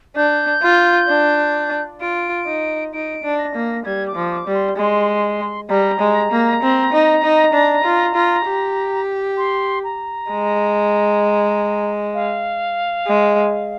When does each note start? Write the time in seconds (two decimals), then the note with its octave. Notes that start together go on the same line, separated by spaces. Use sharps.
0.16 D4 G6
0.63 F4
1.08 D4
2.00 F4 D7
2.46 D#4
2.93 D#4 D7
3.24 D4
3.38 A#6
3.55 A#3
3.85 G3 G#6
4.08 D6
4.15 F3
4.31 D6
4.47 G3
4.54 C6
4.77 G#3 C6
5.70 G3 A#5
6.00 G#3
6.31 A#3
6.62 C4
6.93 D#4
7.23 D#4
7.53 D4
7.84 F4
8.14 F4
8.46 G4
9.37 C6
9.84 A#5
10.30 G#3
12.14 F5
13.07 G#3